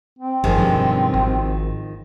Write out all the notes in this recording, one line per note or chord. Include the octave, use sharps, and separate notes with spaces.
C4
G1 D#3 F3 G#3
B1 G2
G#1